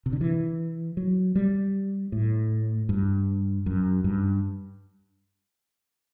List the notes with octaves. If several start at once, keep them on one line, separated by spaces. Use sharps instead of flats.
C3
D3
E3
F#3
G3
A2
G2
F#2
G2